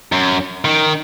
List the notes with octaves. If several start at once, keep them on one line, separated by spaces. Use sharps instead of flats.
F#2
D#3